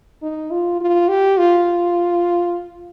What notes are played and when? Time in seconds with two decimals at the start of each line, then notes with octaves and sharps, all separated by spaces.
0.23 D#4
0.51 F4
0.81 F4
1.09 G4
1.38 F4